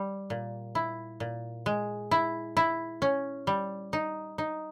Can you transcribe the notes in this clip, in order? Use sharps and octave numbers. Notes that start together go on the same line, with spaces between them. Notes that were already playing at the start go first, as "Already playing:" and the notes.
Already playing: G3
A#2
E4
A#2
G#3
E4
E4
C#4
G3
D#4
D#4